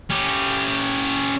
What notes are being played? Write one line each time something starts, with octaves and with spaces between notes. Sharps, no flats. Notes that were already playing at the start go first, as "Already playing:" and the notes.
C#4 G4